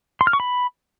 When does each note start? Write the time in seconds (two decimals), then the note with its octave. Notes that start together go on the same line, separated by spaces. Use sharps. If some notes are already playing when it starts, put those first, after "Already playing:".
0.21 C6
0.27 F6
0.33 C#6
0.40 B5